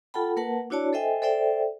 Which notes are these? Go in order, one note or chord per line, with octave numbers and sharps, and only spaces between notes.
F4 A4 F#5 G5 A5 B5
A#3 A#4 B4 F#5 A5
D4 E4 F#4 C#5 D5 A5
A4 C5 D#5 E5 G5 G#5
A4 C5 D5 E5 G5